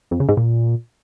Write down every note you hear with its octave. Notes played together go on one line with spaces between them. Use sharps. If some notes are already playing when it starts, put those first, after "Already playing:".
F2
C#3
G#2
A#2